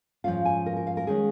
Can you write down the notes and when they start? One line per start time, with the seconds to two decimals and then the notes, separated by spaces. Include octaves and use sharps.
0.24 G#2 F3 G#3 C#4 F4 F5
0.45 G#5
0.66 A#4
0.76 A#4
0.87 F5
0.97 A#4
1.07 D#3 G#3 C#4 G#4